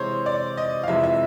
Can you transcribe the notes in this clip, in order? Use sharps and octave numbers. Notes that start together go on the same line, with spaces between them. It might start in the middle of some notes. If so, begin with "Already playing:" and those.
Already playing: C3 E3 G#3 C5 C#5
D5
D#5
F5
F2 C3 E3 G#3 E5
E5